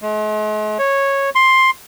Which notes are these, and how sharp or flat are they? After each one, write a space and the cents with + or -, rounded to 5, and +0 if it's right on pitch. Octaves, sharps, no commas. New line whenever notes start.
G#3 +45
C#5 -10
C6 +10